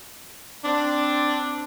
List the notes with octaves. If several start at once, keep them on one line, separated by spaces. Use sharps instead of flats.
C4 D4